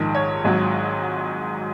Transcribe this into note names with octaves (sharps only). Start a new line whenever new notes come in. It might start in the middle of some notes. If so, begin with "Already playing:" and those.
Already playing: A#1 G#2 D#3
C#5
G#1 G#2 F#3